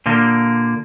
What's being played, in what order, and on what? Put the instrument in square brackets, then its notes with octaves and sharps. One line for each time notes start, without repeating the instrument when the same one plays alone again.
[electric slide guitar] A#2 D3 A#3